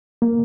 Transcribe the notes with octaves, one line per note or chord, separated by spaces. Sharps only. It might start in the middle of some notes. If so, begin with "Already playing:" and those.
A#3